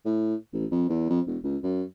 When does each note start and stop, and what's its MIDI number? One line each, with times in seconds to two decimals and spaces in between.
0.05 0.35 45
0.53 0.66 33
0.71 0.85 41
0.89 1.06 40
1.09 1.20 41
1.26 1.37 28
1.43 1.57 37
1.63 1.82 42